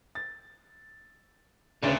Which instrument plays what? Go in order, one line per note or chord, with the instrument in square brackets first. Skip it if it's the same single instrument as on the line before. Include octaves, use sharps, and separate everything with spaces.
[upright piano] A6
[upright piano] D2 D4 A6 [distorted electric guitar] A#2 [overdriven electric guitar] C#3 [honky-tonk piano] C#4 B4